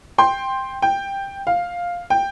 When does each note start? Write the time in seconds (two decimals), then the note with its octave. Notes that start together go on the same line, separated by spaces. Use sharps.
0.18 G5 C6
0.82 G5
1.47 F5
2.10 G5